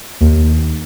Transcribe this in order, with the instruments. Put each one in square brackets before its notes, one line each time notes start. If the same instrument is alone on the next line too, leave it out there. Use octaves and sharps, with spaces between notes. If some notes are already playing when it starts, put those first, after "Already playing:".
[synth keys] D#2